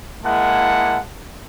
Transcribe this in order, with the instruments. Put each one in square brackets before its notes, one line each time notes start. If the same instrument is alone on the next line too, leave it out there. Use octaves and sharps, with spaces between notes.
[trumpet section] G#3 A#3 E4 F#5 A5